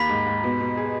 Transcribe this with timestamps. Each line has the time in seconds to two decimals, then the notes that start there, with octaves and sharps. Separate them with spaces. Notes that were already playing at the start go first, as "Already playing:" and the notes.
Already playing: D#2 A#3 B5 B6
0.09 G#2
0.26 G#2
0.43 B2
0.60 B2
0.77 G#4